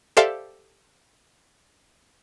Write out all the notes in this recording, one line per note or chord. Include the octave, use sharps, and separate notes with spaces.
G4 A4 C5 D5 E5 F5